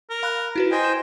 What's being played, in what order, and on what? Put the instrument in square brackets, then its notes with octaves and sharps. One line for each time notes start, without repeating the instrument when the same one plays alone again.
[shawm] A#4
[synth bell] F5 B5 F#6
E4 F#4 B4
[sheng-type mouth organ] C5 D#5 G5 [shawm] G#5
[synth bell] E7